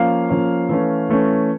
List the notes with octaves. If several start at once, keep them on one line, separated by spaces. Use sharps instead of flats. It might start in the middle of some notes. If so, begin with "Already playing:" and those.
Already playing: F3 A#3 C#4 F5
F3 A#3 C#4
E3 A3 C#4
E3 A3 C#4